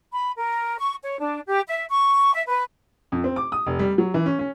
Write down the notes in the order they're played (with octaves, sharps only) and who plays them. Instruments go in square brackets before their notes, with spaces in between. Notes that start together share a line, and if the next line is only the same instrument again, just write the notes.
[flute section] B5
A#4
C#6
C#5
D4
G4
E5
C#6
E5
B4
[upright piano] F2
C4
D6
D#6
F1
G3
F#3
E3
C#4
C#4